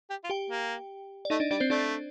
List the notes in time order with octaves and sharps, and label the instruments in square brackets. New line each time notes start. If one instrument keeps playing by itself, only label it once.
[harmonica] G4
F4
[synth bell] G4 G5
[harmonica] A#3
[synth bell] D5
[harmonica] A3 [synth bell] D#4 D#5
[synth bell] D4 D5
[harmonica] G3 [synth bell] D4 D5
[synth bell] C4 C5
[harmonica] A3 [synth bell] D4 D5